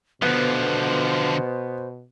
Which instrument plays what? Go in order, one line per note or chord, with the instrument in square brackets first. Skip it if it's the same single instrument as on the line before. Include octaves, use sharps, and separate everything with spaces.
[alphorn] B2 [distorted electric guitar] D3 F3 [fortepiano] B3 [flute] C5